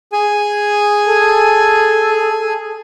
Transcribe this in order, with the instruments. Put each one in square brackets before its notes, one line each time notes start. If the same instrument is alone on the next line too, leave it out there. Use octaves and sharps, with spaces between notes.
[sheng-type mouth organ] G#4 G#5
[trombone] A4